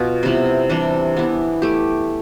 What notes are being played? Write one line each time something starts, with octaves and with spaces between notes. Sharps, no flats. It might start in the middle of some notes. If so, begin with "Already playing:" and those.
Already playing: B2 B3 F4 B4
C3 G3 B3 E4
C3 E3 G3 D4
E3 B3 E4
A3 E4 G4